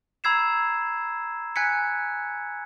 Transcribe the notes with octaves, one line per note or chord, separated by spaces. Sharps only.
A#5 B5 E6 G#6 C7 E7
G#5 F#6 G#6 B6 C#7